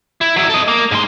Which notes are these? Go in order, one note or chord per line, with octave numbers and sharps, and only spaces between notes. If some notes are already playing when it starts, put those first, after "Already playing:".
E4
F#3 E4
A4 D#5
A#3
G#2 C6